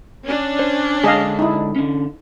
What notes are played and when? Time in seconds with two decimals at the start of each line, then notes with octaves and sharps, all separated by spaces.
0.25 C#4 D4
0.59 C5
1.04 D3 G#3 G#4 D#5 F5 A5
1.39 D#4 E4
1.76 D3 C#4